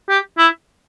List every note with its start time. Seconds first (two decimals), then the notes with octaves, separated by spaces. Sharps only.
0.09 G4
0.38 E4